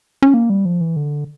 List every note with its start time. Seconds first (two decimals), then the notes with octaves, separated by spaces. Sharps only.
0.22 C#4
0.34 A#3
0.50 G3
0.65 F3
0.81 E3
0.96 D3